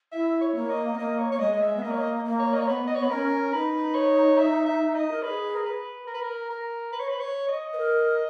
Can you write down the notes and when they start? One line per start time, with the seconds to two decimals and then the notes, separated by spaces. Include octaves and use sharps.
0.12 E4 E5
0.41 C#5
0.55 A#3
0.70 D#5
0.93 B3
0.98 A#3 D#5
1.19 C#5
1.32 A#3 C#5
1.40 G#3 D#5
1.53 D#5
1.61 E5
1.76 B3
1.82 A#3 D#5
1.91 C#5
1.98 D#5
2.25 A#3
2.39 C#5
2.54 D#5
2.60 C#5
2.67 B3 B4
2.87 D#5
2.95 C#5
3.00 B3 B4
3.10 C#4 A#4
3.53 D#4 B4
3.95 C#5
4.38 E5
4.66 E5
4.94 D#5
5.11 A#4
5.23 G#4 B4
5.55 A#4
5.66 B4
6.07 A#4
6.14 B4
6.21 A#4
6.50 A#4
6.93 B4
7.00 C#5
7.09 B4
7.20 C#5
7.49 D#5
7.73 B4
7.78 A#4